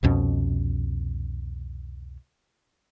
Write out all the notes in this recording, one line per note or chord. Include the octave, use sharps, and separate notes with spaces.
C2 F2 B2 C#4